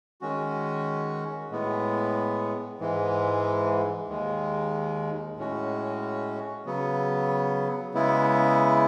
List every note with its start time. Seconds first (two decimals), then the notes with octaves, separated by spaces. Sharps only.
0.21 D#3 G#3 C#4 F#4
1.50 A2 G#3 B3
2.79 G#2 E3 G#3
4.08 D#2 D#3 G#3
5.37 A2 G#3 C#4 F#4
6.65 C#3 F#3 B3
7.94 C#3 G#3 B3 E4